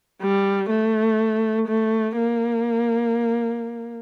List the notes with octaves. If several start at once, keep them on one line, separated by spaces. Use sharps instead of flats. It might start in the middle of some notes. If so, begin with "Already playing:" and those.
G3
A3
A3
A#3